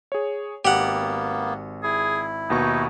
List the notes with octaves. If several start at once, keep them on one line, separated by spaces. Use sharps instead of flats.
G#4 C#5
G#1 A#3 B3 G4 F#5
E4 G#4
D#2 B2 D#4 C#6